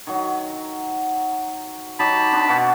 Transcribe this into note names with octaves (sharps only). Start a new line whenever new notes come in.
D#3 F#3
F#3 D#4 G4 A5 B5
C4 D4 D#5
B2 F#4 F5